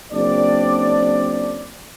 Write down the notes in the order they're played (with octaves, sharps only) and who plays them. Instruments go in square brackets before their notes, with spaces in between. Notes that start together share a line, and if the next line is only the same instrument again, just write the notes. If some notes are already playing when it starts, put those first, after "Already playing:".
[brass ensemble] F#1 C4 D4 D5